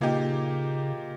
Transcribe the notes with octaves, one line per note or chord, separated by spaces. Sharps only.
A#2 C#3 A#3 D#4 G4